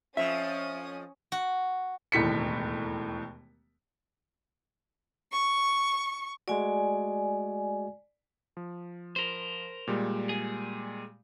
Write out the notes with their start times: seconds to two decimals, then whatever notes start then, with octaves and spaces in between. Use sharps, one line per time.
0.17 F2 F3 C#4 E5 D#6
1.32 F#4
2.12 E1 D#2 A2 B6 C#7
5.31 C#6
6.48 G#3 A3 F#4 D5 G#5
8.57 F3
9.16 A#4 C5
9.87 A#2 G3 G#3
10.29 G#4